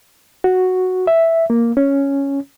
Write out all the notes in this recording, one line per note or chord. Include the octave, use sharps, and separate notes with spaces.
F#4
E5
A#3
C#4